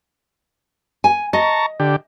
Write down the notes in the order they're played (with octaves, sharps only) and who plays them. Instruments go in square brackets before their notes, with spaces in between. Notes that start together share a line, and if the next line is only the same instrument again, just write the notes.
[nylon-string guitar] G#5
[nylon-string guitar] D#5 [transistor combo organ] A5 A#5 C#6
[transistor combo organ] D3 G4